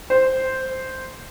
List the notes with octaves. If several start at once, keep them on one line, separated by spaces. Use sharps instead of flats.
C5